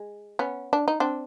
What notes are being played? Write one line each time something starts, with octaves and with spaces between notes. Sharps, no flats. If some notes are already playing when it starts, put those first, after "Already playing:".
Already playing: G#3
B3 C#4
D4
D#4
C4 D4